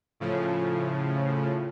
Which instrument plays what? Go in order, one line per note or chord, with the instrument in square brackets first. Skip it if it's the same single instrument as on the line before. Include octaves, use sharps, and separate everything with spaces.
[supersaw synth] A2 C#3 F3